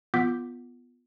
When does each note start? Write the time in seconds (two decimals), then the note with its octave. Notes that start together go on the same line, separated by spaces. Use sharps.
0.14 B3 F4 F#5 D6 G6 B6